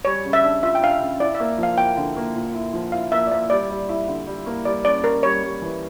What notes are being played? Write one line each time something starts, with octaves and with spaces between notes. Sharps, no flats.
G3 C#5
C#3
E5
D4
F4 E5
G5
D4 F5
E5
C#3
E4 D5
E5
A#3
F3
F5
A#3 G5
D3
A#3
A#2
E4
F3
E4 F5
A#3 E5
D5
A#3 E5
G3 D5
G3
E4
D3
G3
A#3
G3 D5
C#4 D5
C#4 A#4
G3 C#5
G3
E3